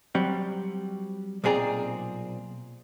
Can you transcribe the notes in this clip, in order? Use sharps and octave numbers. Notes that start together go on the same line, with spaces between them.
F#3 G3 C4
B1 A#2 C4 G#4 D5 A#5